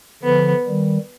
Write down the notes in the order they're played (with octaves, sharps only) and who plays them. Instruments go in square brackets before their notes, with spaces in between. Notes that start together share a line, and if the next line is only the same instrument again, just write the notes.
[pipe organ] D3 F3 [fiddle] B3
[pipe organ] D#3 G3